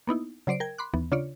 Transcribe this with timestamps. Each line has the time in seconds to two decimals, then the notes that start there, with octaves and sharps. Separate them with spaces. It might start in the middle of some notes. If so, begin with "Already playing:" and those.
0.07 A#3 B3 D#4 E4
0.47 C#3 F#3 C5 D5 C7 D7
0.60 A#4 G5 G#6
0.78 B5 C6 D6 F#6
0.94 D#2 E3 B3
1.12 C#3 D4 F4 C#5 D5